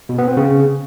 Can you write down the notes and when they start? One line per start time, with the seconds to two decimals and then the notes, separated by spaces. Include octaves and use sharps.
0.09 B2
0.18 B3
0.28 C4
0.37 C#3